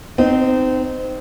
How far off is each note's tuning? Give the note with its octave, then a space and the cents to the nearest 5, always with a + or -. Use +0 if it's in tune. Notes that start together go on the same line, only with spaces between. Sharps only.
C4 -25 D#4 -15